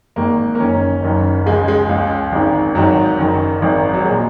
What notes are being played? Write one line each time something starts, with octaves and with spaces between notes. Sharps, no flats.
G#1 G#2 D#3 A#3
A#3
F#1 F#2 D#3 C#4
F#1 F#2 D#3
C#2 C#3 G#3
G#3
C#2 C#3
G#1 G#2 D#3
G#1 G#2 D#3 F#3
F#1 F#2 D#3
G#1 G#2 D#3
F#3
A#2 G#3